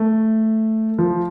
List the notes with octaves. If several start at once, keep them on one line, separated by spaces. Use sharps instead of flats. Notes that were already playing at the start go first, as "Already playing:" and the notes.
Already playing: A3
F3